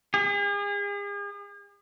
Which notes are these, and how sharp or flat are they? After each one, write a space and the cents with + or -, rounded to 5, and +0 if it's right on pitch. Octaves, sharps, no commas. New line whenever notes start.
G#4 -40